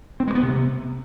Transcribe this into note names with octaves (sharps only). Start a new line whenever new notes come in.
C4
G#3
B3
C3